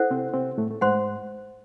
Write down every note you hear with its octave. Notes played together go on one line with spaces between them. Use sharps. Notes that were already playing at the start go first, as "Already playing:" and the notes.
Already playing: E4 A4 C5 F#5
C3 C4
C3 C4
A2 A3
A3
G#2 G#3 C5 F#5 C6